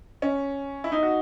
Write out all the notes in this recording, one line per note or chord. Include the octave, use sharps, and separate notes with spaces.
C#4
E4
D#4
F#4